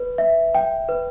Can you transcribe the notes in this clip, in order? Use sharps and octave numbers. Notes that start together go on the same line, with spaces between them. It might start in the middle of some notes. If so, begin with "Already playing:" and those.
Already playing: B4
E5
G5
B4